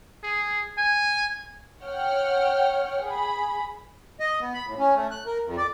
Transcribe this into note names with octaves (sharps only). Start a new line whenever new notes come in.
G#4
G#5
C#5 F#5 G5 F6
G#4 B5
D#5
B3
B5
A2
C#4
A3
F#6
A#4
F2
D5